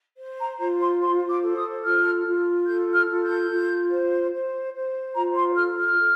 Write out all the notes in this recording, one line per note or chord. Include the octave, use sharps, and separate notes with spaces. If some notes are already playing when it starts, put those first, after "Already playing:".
C5
A#5
F4 A#5
C6
C5 C6
D6
A4
D#6
F4 F6
F4
A4 G6
F6
F4
G6
F4
C5
C5
C5
F4 A#5
C6
A4 F6
F6
A4